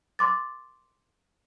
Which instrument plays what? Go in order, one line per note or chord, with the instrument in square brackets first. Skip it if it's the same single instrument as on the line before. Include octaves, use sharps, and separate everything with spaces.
[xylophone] C6 D6 A6